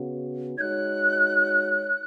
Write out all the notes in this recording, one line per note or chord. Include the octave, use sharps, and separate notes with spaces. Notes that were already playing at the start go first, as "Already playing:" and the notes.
Already playing: C#3 B3 F#4
G#3 D#4 F#4 C#5 F#6 G#6